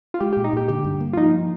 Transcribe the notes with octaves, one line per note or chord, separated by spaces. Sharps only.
F4
G#3 G4
G4
A#2
D#4
A#2 G4
D3 G4
G2
A#3
F4
F3 D#4